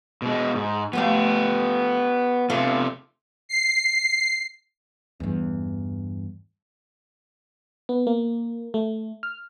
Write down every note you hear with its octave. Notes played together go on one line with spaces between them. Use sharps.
B2 G#3
G#2
F3 A3 B3 G4 F5
C3 A3 B3 D4 F4
C7
E2 G2
B3
A#3
A3
F6